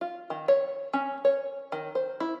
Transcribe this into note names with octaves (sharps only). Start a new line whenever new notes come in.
F4
D#3
C#5
C#4
C#5
D#3
C5
E4